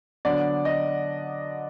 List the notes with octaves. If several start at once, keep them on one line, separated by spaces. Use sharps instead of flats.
D3 F#3 B3 D4 D5
D#5